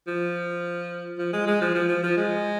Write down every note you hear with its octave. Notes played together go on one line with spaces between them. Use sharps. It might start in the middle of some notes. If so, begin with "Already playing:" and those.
F3
F3
G#3
G#3
F3
F3
F3
F3
G#3